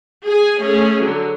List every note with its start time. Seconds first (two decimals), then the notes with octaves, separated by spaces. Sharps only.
0.24 G#4 G#5
0.59 A3 C#4 G#4
1.00 D3 F#3